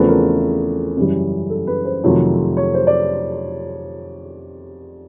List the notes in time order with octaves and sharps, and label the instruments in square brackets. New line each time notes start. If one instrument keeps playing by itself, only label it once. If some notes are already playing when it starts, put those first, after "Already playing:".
Already playing: [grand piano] E2 C#3 F3 A3 C4 B4
A#4
F#2 C#3 E3 G3
A4
B4
C5
F2 C3 D#3 F#3 A3 C#5
C#5
C5
D5